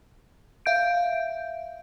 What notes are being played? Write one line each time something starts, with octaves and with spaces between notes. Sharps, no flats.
E5 F5 G6 D7